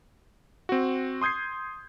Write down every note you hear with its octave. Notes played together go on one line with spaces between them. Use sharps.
C4 F#4
C6 D#6 G6 G#6 C7